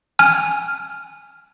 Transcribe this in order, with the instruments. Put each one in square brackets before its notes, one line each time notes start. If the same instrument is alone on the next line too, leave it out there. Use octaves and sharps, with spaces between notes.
[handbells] G#5 F6